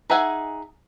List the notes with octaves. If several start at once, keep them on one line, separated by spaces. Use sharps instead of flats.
D#4 G#4 E5 F#5 G#5